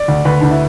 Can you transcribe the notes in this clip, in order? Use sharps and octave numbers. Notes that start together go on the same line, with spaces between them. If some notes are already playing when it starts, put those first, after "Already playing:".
Already playing: D5
D2
D2 B4
D2 D4
E4